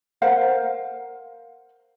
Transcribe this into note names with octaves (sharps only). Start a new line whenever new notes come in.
A#4 C5 F5 F#5